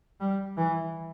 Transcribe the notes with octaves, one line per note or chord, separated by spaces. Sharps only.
G3
E3